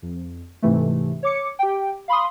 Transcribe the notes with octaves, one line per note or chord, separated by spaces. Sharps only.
F2
G#2 C3 E3 A3
C#5 D6 C#7
G4 G5
F5 B5 C6 D#6